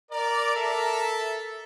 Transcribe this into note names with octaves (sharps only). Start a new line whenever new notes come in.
A#4 D5
A4 E5